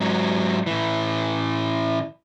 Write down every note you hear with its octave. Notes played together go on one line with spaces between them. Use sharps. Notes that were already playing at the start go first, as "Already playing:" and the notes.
G#2 F#3
A2 E3